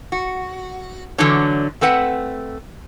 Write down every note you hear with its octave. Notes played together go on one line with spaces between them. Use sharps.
F#4
D3 E3 F#3 A3 D4 C#5
A3 C4 B4 F#5